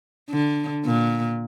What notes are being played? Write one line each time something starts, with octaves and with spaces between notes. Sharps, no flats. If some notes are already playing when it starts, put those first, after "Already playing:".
D3
A#2